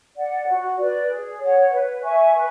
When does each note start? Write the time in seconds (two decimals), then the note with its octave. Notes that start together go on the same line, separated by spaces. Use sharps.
0.16 D5 F#5
0.46 F#4
0.78 B4 D5
1.08 G#4
1.39 C#5 F#5
1.71 B4
2.02 E5 G#5 C#6
2.34 B4